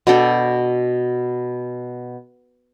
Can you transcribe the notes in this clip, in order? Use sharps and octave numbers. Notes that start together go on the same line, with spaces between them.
B2 D4 A4 G5